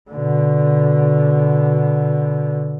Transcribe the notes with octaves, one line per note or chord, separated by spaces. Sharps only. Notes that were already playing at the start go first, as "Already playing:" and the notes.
B2 D3